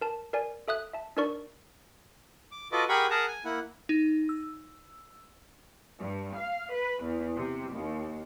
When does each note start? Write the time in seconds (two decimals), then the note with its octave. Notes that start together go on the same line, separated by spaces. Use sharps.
0.01 A#4 A5
0.33 A#4 D5 G#5
0.68 A4 E5 D#6 F#6
0.93 E5 A5
1.17 D4 D#4 A#4 D5 C#6
2.52 D6
2.72 F4 F#4 A4 B4 D#5 D6
2.89 G4 G#4 A#4 F#5 B5 C#6
3.10 G#4 A#4 F#5 A5 A#5
3.27 G#5
3.45 A#3 E4 F#5
3.89 D#4
4.29 E6
5.99 G2
6.37 F5
6.73 B4
7.03 E2
7.36 C3
7.72 D#2